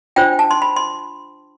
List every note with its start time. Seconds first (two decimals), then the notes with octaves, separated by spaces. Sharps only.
0.16 D4 F4 C5 G5
0.39 A5
0.51 C6
0.62 B5
0.76 C6